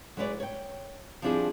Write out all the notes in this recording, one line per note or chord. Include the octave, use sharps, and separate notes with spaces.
F#3 G#3 E4 B4 C#5 D5
C#5 G5
F3 G3 C4 D4 E4 G#4